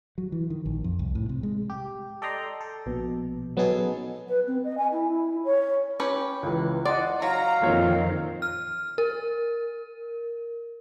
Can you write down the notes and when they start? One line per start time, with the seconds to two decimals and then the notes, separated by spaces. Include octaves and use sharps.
0.18 F#3
0.32 E3
0.50 D#3
0.66 A#1
0.84 F2
0.99 C2
1.15 A2
1.29 C3
1.43 G#3
1.70 G4
2.22 A4 D5 D#5 G5 A#5 C6
2.61 A4
2.86 A#1 B2
3.57 F#3 B3 C#4 D#4 G#4 A4
4.29 B4
4.48 C4
4.64 D#5
4.78 G#5
4.92 E4
5.44 C#5
6.00 C#4 G4 B4
6.43 C#2 E3
6.85 D5 D#5 F#5 C6
7.22 F#3 F5 A#5
7.62 F2 A#2 D#3 C4 C#5
8.42 F6
8.98 A#4